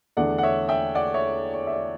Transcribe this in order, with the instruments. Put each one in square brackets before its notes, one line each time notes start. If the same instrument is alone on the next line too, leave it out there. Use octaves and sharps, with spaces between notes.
[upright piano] E2 D3 A3 D4 D5 F#5
F#5
C#5 E5
E5 G5
D5 F#5
C#5 E5
C#5
E5
D5